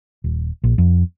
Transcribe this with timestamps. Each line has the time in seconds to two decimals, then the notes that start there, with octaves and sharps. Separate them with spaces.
0.24 D#1
0.64 A#1
0.78 F2